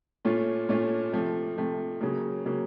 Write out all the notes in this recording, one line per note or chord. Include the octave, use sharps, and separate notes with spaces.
A#2 A3 C#4 F4
A#2 A3 C#4 F4
C3 F3 A3
C3 F3 A3
C#3 F#3 A#3
C#3 F#3 A#3